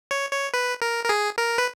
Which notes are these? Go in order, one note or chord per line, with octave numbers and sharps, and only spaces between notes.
C#5
C#5
B4
A#4
A#4
G#4
A#4
B4